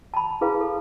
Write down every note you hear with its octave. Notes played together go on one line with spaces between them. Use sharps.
A5 B5
E4 G#4 B4 F5
A4